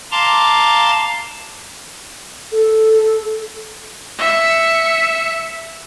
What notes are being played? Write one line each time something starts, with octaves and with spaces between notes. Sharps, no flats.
F5 A5 A#5 C6 D6
A4
E5 C#7